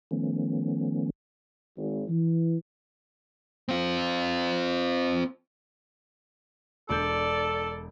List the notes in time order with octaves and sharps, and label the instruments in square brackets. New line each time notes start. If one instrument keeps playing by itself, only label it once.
[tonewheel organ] D#3 F3 A3 B3 C#4
[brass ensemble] G#1
E3
[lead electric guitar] C4 F4
[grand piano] E1 D4 G6 [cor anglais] A4 [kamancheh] D5